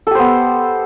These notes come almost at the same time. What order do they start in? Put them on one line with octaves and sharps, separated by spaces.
A4 G4 C5 B3